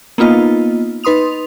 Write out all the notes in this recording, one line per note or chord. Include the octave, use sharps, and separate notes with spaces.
A#3 B3 D#4 F4 D#5
D#4 B4 C6 D#6 F7